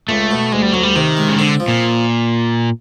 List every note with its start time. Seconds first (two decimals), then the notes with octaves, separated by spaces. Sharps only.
0.09 C#2 A3
0.31 B2
0.52 D2 G#3
0.62 G3
0.73 D2 F#3
0.83 G3
0.95 C3 D#3
1.17 G#3
1.29 C#3
1.38 D3 C4
1.60 F3
1.68 A#2